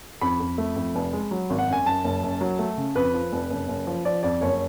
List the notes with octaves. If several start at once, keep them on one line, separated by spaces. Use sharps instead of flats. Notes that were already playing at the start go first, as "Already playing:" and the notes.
F2 B5
F2
A3
F2
F1
G#3
F#3
G#1
F#5
F#2 G#5
F#2 A5
F#1
F#2
F#3
A3
C#3
F2 B4
F3
F1
F#1
F#1
F3
F3 D5
F2 D5
F#1 C#5